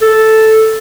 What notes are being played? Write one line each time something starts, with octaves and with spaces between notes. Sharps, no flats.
A4